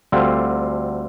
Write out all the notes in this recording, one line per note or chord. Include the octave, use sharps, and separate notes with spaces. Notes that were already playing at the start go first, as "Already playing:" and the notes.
D2 D3 G3 C4 F4